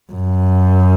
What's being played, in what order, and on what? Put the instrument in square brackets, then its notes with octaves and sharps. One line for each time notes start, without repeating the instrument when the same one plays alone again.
[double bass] F#2